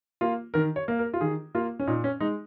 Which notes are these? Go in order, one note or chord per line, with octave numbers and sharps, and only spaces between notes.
A#3 F4
D#3 A#4
C#5
A#3
A#4
F4
D#3 G#4
A#3 F4
C#4
A#2 D#4
C#4
G#3 D#4